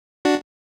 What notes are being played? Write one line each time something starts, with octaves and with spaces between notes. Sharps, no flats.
D4 F#4